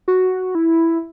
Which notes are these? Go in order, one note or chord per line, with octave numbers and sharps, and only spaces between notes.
F#4
E4